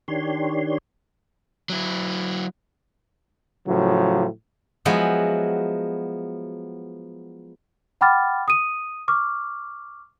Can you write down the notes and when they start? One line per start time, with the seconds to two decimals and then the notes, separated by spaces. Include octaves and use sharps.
0.08 D#3 D4 G4 C#5 C6
1.70 F#3 E4
3.67 A2 C#3 F3 F#3
4.85 F3 F#3 G#3 B3 E4 F#4
8.01 F#5 G5 B5 D6 F6 A6
8.48 D#6 D#7
9.08 C#6 D6 F6